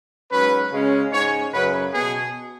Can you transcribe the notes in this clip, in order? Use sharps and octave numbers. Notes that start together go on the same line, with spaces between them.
G#2 F#3 C#4 B4
C#3 G#3 C#4
G#2 G#3 C#4 C#5
F#2 C#3 F#3 B4
B2 B3 G#4